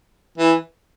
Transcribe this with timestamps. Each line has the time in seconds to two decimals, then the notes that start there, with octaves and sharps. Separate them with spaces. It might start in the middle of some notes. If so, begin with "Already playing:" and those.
0.38 E3